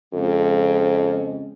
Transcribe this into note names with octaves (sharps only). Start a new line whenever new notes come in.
F2 C#3 F3 G#3